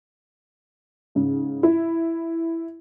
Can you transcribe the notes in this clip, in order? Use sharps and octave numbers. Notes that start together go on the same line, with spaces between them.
G#2 C#3
E4